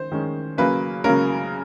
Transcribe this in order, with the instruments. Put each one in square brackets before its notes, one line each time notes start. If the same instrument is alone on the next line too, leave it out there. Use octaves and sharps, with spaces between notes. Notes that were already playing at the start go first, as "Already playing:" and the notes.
Already playing: [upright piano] D#3 C#4 C5
D#3 G#3 C#4
C#3 F#3 A#3 C#4 B4
C#3 F#3 A#3 C#4 A#4